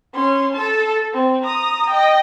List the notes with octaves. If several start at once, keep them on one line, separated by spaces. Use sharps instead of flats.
C#4 C6
A4 A5
C4
A#5 D#6
D#5 G5